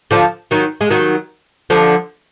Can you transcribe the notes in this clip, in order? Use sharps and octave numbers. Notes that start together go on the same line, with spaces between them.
D3 F3
D#3 F#3
G#3
D#3 F#3
D3 F3